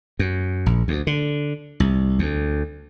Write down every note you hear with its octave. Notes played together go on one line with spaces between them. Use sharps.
F#2
A#1
D2
D3
C2
D2